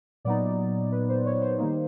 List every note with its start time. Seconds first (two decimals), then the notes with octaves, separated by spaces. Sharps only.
0.25 A#2 F#3 B3 D#4 D5
0.92 B4
1.09 C5
1.26 C#5
1.42 C5
1.59 D#3 G3 A#3 D#4 C5